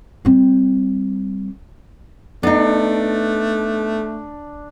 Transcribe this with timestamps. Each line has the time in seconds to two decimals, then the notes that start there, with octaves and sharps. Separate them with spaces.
0.25 G3 C4
2.43 A3 B3 D4 D#4